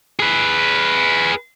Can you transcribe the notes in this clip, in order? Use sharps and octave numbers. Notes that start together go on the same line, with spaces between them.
G#4 B4